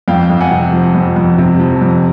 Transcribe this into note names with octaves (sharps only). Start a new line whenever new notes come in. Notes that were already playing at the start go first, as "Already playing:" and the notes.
F2 F5 G5
F2
F#5 G#5
C3
F3
F2
F2
C3
F3
F2